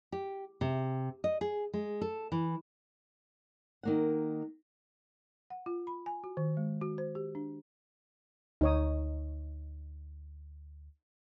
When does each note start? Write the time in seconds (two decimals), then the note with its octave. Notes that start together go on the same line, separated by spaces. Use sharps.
0.12 G4
0.61 C3
1.24 D#5
1.41 G#4
1.73 G#3
2.01 A4
2.32 E3
3.83 D#3 A#3 F#5
5.50 F#5
5.66 F4
5.87 B5
6.06 G#5
6.24 F#4
6.37 D#3
6.57 G#3
6.82 F#4
6.98 C5
7.15 G4
7.35 D4
8.61 D2 D#4 C#5 D#6